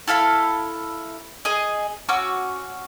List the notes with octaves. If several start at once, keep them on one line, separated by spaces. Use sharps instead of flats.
E4 A4 F5 B5
G#4 D#5
C#4 F#4 D6 E6